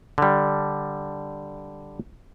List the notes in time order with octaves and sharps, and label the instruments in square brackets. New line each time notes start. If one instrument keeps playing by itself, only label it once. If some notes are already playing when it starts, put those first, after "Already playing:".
[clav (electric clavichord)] D3 G3